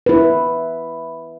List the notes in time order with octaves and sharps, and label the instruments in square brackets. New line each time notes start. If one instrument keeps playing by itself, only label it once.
[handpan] E4 B4